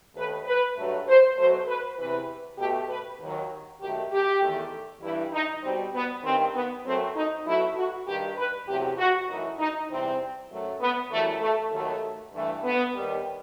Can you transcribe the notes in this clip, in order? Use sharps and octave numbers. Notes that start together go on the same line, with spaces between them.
D#2 D#3 A3 B4
B4
G2 F#3 A3
C5
B2 F#3 A3 C5
B4
E2 C3 E3 B4
B2 A3 G4
B4
D#2 D#3 F#3
F#2 D#3 A3 G4
G4
E2 D#3 A3
G2 E3 G3 E4
D#4
B2 G3 C4
B3
G2 D#3 G3 C4
B3
F#2 F#3 A3 C4
D#4
B2 F#3 A3 E4
F#4
G2 D#3 G3 G4
B4
E2 C3 F#3 A3 G4
F#4
F#2 E3 A3 D#4
D#4
E2 C3 E3 G3 C4
F#2 F#3 A3
B3
F#2 E3 G3 A3
A3
D#2 D#3 F#3 A3
G2 E3 A3
B3
D#2 D#3 G3